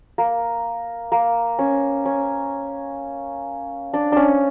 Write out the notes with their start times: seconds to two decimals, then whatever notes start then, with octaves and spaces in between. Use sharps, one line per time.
0.18 A#3
1.12 A#3
1.59 C#4
2.05 C#4
3.94 D4
4.12 C#4 D4